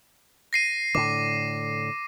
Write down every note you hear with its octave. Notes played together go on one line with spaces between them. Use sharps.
A#6 C7 D#7
A2 D3 D6